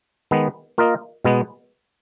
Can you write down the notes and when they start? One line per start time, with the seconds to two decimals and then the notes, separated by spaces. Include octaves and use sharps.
0.31 D#3 G#3 B3
0.78 A#3 F4 A#4 D#5
1.25 B2 G#3 B3